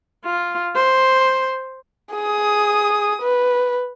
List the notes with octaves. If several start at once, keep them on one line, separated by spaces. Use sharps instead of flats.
F4
C5
G#4 D#6
B4